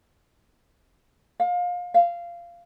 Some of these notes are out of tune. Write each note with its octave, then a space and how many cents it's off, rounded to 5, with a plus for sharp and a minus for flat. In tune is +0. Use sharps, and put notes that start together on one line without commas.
F5 +30
F5 -15